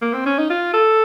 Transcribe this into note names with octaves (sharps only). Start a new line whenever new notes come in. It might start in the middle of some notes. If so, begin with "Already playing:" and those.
A#3
C4
C#4
D#4
F4
A4